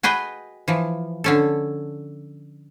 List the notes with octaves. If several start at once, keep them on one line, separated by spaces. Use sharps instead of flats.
F#4 G#4 B4 D#5 G5
E3 F3
D3 C#4 A4